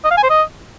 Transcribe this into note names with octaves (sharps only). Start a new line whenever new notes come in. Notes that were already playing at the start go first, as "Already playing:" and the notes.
D#5
F5
G#5
C5
D#5